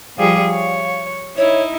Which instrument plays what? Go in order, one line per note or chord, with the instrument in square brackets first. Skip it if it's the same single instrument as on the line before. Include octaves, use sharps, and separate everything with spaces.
[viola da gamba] F3 G3 G#4 [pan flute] F5
[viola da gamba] C#5
[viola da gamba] D#4 E4 [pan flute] C#5